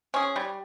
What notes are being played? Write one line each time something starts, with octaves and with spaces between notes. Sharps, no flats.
C#4 G#4
G3